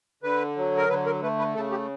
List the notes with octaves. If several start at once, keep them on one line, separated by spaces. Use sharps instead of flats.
D3 B4
F#3
A#4
D3 B4
A#4
A3 B4
B4
C#3 A4
G4